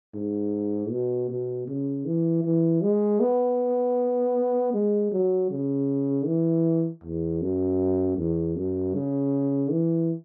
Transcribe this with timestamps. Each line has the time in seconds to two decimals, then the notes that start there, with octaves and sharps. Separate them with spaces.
0.14 G#2
0.91 B2
1.29 B2
1.68 C#3
2.05 E3
2.44 E3
2.82 G#3
3.20 B3
4.73 G#3
5.11 F#3
5.51 C#3
6.27 E3
7.04 E2
7.42 F#2
8.17 E2
8.56 F#2
8.94 C#3
9.71 E3